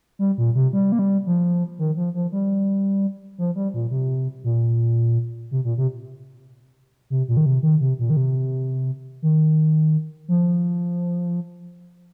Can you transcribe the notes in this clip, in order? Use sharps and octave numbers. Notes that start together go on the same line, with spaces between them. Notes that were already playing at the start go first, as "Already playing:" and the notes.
G3
A#2
C3
G3
A#3
G3
F3
D#3
F3
F3
G3
F3
G3
A#2
C3
A#2
C3
A#2
C3
C3
A#2
D#3
C3
D#3
C3
A#2
D#3
C3
D#3
F3